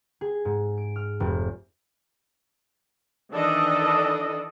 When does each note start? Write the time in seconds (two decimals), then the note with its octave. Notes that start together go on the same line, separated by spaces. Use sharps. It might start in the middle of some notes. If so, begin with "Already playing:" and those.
0.21 G#4
0.45 G#2
0.78 D7
0.96 F6
1.20 F1
3.32 D#3 E3 D4 A4 D5 D#5